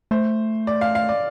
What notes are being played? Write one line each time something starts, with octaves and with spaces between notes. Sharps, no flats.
A3 C5
D5
F5
F5
D5